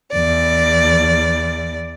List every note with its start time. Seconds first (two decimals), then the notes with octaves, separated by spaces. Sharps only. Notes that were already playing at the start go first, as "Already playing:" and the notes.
0.12 E2 D5